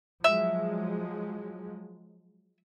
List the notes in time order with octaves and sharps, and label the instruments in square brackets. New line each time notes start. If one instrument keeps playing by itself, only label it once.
[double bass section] F3 F#3 G#3 [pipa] E5